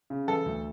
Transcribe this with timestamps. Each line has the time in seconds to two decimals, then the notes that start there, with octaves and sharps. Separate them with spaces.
0.10 C#3
0.28 E3 A4
0.46 D2